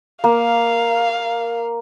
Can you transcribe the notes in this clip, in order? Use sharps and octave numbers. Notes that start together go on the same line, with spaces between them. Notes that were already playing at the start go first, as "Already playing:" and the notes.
A#3 F5